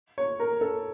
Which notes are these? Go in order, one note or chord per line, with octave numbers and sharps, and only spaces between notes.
C#5
A#4
A4